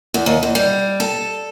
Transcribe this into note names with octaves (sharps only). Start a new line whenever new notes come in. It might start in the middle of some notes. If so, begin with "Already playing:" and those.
E2
D#2
E2
G3
A4